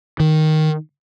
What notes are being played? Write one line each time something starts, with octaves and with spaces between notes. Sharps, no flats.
D#3